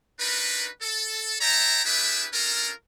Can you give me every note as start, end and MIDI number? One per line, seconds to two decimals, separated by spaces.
0.19 0.68 62
0.19 0.68 63
0.19 0.68 66
0.19 0.68 70
0.19 0.68 71
0.81 1.36 69
1.41 1.82 73
1.41 1.82 76
1.41 1.82 79
1.41 1.82 81
1.41 1.82 82
1.85 2.25 62
1.85 2.25 64
1.85 2.25 67
1.85 2.25 68
1.85 2.25 71
1.85 2.25 76
2.33 2.71 61
2.33 2.71 62
2.33 2.71 65
2.33 2.71 69
2.33 2.71 70